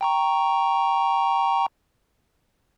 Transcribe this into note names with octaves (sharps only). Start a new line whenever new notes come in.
G5 A#5 C#6